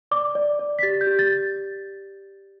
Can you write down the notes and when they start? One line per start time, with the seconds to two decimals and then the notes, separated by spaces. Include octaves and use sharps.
0.11 D5 D6
0.35 D5
0.59 D5
0.79 B6
0.83 G4 A6
1.01 G6
1.07 G4
1.19 A6